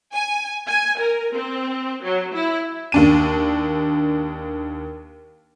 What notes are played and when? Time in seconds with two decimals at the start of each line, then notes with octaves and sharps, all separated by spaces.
0.13 G#5
0.67 G#5
0.99 A#4
1.33 C4
2.02 F#3
2.33 E4
2.92 D#2 D4 D#7